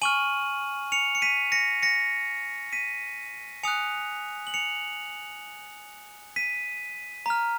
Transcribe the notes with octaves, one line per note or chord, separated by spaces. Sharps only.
G#5 C#6 F6 D#7 F#7
C#7 F7
C#7
B6 D#7
A#6 C#7
A#6 C#7
B6 D#7
G#5 D#6 F#6 C#7 F7
F#7
C#7 F7
B6 D#7
A#5 F6